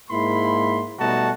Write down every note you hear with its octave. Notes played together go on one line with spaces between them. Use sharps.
G#2 A#3 E4 B5 C6
B2 G3 A3 D#4 F#4 A5